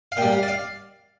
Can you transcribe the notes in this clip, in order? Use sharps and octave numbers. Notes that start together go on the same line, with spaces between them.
F5
A#2 G3 G5
F5
D5
F5